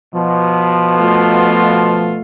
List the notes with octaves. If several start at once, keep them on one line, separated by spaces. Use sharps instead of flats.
B2 F3
A3 F4